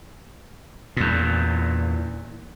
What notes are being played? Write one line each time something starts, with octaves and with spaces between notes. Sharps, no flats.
E2 A#2